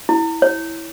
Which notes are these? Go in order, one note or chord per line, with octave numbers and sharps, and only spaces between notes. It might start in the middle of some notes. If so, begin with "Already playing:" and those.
E4
C#5